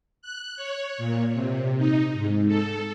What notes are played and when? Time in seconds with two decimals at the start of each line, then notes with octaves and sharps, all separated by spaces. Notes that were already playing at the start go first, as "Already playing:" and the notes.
0.22 F#6
0.56 C#5
0.98 A#2
1.34 C3
1.78 D#4
2.14 G#2
2.47 A4